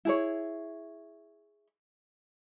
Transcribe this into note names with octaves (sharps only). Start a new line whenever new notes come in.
E4 G#4 C#5